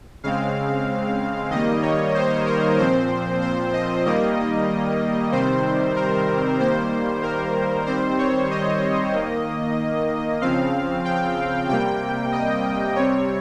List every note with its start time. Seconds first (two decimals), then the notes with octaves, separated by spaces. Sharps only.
0.24 C#3 G#3 C4 F5
1.50 D#3 G3 A#3 D#5
1.82 C#5
2.15 C5
2.46 A#4
2.78 A#2 F3 C4 C5
3.41 C5
3.73 D#5
4.05 D#3 G3 A#3 D#5
5.32 C3 D#3 G3 C4 C5
5.96 A#4
6.59 D#3 G3 A#3 C5
7.23 A#4
7.86 D#3 G3 C4 C5
8.18 C#5
8.51 D#5
9.13 D#3 A#3
10.42 C#3 F3 C4 F5
11.05 G5
11.68 C3 G3 A#3 G5
12.32 D#5
12.96 C3 G3 C4 C#5